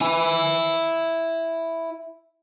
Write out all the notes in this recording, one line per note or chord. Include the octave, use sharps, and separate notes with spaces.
E4 G#5